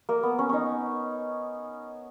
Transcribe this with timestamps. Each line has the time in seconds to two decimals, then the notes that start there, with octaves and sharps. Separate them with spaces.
0.09 A#3
0.23 B3
0.39 C#4
0.49 C#4 D#4